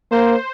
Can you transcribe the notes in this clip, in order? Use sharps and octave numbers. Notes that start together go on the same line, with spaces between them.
A#3 C5